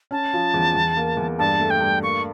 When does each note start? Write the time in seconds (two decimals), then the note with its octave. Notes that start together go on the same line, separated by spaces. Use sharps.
0.11 C#4 A5
0.33 F3
0.54 E2
0.75 E2
0.97 A#3
1.17 E2
1.39 G2 A5
1.60 A3
1.70 G5
1.80 G2
2.02 A#3 C#6